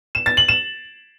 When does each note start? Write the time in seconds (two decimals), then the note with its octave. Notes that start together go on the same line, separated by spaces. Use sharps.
0.15 E7
0.26 A6
0.37 F#7
0.48 E7